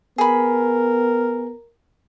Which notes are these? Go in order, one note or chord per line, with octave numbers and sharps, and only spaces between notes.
B3 G#4 A#4 B5